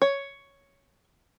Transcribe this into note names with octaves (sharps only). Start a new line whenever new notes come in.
C#5